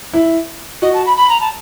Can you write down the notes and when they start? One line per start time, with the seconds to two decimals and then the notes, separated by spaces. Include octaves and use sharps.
0.13 E4
0.82 F#4 D#5
0.94 A5
1.06 B5
1.17 B5
1.29 A#5
1.41 A5